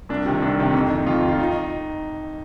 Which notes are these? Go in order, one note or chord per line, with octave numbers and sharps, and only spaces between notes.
C2 D4
C3 D#3
C2 D4
C3 D#3
F2 D#4
D#3
F2 F4
D#3
F4
D#4